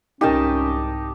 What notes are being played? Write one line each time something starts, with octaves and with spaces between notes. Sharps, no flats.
C2 G#2 C#4 D#4 G4 A#4 D#5 A5